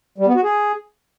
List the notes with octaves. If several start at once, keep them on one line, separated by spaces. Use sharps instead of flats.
G3
B3
F#4
G#4